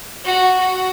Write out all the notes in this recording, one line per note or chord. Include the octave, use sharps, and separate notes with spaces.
F#4
F#4